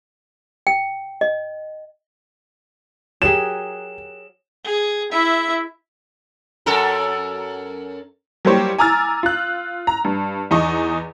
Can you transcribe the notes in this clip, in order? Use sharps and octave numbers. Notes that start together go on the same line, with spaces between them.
G5
D#5
F#3 G4 G#4 A#4 E7
G#4
E4 E5
F#2 A4 A#4
F#3 G3 A#3 G4 C5 C#5
G#5 A#5 D6 E6 F6 A6
F4 F#6
A#5
G2
E2 D#4 D#5 C#6